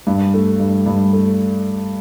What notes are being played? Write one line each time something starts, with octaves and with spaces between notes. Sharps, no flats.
G2
A3
G2
G2
A3